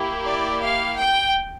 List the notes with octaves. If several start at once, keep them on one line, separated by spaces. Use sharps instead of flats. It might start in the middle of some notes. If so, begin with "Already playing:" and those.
Already playing: A#3 E4 G4
D5
F5
G5